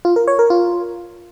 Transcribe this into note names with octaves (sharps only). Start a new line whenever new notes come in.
F4
A#4
C#5
A#4
F4